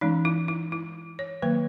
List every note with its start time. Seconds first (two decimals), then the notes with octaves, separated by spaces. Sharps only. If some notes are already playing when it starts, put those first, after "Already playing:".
0.01 E3 G#3 C#4 D#4
0.25 E4
0.48 E4
0.72 E4
1.19 C#5
1.42 D#3 F#3 A#3 B4